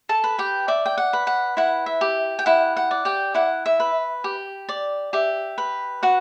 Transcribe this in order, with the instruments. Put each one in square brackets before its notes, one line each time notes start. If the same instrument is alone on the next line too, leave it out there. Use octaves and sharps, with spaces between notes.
[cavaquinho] A4 A5
B4
G4 G5
D5 E5
G5
F#5
B4
F#5
E4 F#5
E5
G4
G5
E4 F#5
F#5
D5
G4 G5
E4 F#5
E5
B4
G4
D5
G4 E5
B4
F#4 F#5